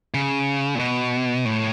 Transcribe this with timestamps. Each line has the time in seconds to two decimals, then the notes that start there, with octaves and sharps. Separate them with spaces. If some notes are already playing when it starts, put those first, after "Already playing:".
0.14 C#3
0.75 A#2
0.79 B2
1.45 A2